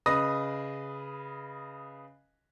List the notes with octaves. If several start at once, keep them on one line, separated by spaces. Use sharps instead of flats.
C#3 B4 D#5 D#6 A#6